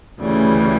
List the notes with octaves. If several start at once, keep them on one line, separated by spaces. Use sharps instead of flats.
D2 C#3 E3 G3